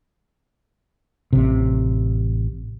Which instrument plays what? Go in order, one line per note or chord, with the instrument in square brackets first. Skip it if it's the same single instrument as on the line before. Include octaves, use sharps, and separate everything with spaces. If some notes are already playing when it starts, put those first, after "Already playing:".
[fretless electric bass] A1 C3